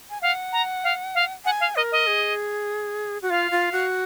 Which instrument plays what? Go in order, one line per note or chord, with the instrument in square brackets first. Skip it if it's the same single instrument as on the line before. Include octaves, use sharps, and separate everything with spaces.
[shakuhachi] G#5
[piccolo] F5 [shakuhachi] F#5
[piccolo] A#5
F5
F5
[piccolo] F#5 [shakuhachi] G#5
[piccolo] F5
[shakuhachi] A#4 [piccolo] D#5
[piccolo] D#5
[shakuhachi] G#4
F#4
[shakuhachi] F4 [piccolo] F5
[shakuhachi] F4
F#4